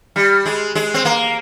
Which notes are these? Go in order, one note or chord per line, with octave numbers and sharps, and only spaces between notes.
G3
G#3
G#3
C4
A#3